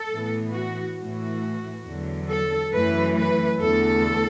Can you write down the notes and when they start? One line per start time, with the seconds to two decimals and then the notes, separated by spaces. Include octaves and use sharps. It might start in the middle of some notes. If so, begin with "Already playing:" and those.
Already playing: A4
0.10 A2 E3 B3
0.53 F#4
0.98 A2 E3 A3 F#4
1.86 E2 D3 F#3
2.29 A4
2.72 F#2 E3 A3 B4
3.17 B4
3.60 E2 D3 A3 A4